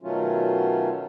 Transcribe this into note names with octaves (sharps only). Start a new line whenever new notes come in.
B2 D#3 F#3 A3 C#4 F4